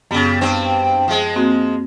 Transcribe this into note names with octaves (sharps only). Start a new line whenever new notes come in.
F#2 C#3 G3 B3
G2 C4
F3 G#3
A#3 C4 F#4